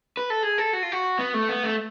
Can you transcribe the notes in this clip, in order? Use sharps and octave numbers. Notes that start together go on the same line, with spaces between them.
B4
A4
G#4
A4
F#4
F4
F#4
B3
A3
B3
A3